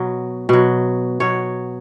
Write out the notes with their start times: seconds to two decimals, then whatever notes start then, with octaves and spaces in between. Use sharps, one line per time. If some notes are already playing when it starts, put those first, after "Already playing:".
Already playing: B2 F#3
0.49 B2 F#3
1.20 B2 F#3 C#5